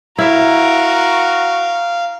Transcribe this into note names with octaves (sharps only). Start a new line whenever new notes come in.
E4 F#4 A#4 E5 F5